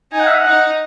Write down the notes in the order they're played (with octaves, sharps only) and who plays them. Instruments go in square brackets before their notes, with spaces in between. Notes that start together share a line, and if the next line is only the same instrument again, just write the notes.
[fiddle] D#4 [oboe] G#5
[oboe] F#5
E5
F#5
[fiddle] D#4